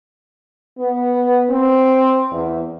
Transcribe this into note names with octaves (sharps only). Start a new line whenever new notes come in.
B3
C4
E2